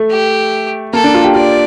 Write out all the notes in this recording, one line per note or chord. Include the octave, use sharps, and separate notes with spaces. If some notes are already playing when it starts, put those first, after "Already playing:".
Already playing: A3
G4
A#3 A4
D4
F4
G4
F4 D5